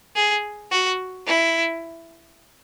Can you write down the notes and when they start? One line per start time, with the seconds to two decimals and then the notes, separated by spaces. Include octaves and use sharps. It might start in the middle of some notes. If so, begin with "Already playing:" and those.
0.16 G#4
0.72 F#4
1.27 E4